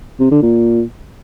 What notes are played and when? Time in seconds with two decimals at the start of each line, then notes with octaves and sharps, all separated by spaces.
0.20 C3
0.31 D3
0.42 A#2